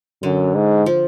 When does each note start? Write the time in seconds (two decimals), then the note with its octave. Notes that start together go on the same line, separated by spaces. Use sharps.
0.23 F#2 D3
0.55 G#2
0.86 F3